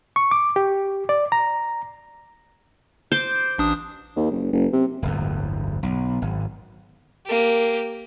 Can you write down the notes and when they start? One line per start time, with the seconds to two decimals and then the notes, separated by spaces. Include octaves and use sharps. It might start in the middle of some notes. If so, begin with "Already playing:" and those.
0.16 C#6
0.31 D6
0.56 G4
1.09 D5
1.32 A#5
3.12 C5 D6
3.59 A1 D4 D#6
4.16 D#2
4.31 F#1
4.53 F#1
4.73 C3
5.02 D1 G1 E2
5.83 B1
6.22 G#1
7.26 A#3 G4